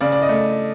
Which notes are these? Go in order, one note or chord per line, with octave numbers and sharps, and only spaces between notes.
C#3 D5
D5
D#5
A3